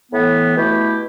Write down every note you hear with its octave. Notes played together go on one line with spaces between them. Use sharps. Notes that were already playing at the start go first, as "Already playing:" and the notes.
A2 E3 B3
B2 A3 E4 G4